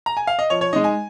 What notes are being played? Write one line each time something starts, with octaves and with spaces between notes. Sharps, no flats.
A#5
G#5
F5
D#5
F3 C#5
C#5
G#3 D#4 D#5
G#5